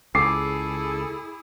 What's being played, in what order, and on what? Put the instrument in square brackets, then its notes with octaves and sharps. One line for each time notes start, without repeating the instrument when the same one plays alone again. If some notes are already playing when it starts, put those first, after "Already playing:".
[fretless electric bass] C#2 [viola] E4 G#4 [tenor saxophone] A4 [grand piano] D6 C7